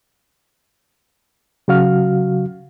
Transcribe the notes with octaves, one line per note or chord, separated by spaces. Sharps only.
C#3 F#3 F#4 F5 F6